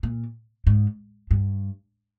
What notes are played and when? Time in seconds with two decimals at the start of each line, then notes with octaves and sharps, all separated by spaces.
0.03 A#2
0.67 G#2
1.31 G2